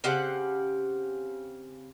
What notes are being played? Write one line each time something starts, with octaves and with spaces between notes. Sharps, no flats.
C#3 C4 G4 F#5